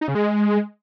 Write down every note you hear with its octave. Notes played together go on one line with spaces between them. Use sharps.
D#4
C#3
G#3